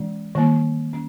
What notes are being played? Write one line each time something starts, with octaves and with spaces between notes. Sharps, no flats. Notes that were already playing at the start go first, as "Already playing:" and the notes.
Already playing: E3 G#3 C#4
D#3 G3 A#3
C#4